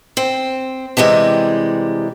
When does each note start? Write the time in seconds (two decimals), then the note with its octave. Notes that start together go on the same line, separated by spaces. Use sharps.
0.17 C4
0.97 C3 E3 G3 G#3